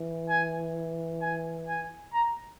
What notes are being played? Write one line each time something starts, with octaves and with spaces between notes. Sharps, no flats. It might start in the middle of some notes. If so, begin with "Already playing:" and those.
Already playing: E3
G#5
G#5
G#5
A#5